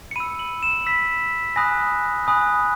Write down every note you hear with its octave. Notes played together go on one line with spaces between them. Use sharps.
C#7
B5 E6 D#7
F#7
E7
B5 E6 B6
G#5 B5 D#6 F#6 A#6
G#5 B5 D#6 F#6